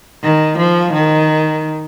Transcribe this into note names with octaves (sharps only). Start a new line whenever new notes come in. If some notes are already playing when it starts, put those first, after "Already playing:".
D#3
F3
D#3